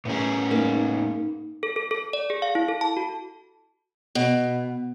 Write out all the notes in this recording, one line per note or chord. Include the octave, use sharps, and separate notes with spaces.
A2 B3 C#4 G#4 A#4
A#3 D#4
A4
A4
A4
D5
G#4
F5
E4
A4
A5
F#4
B2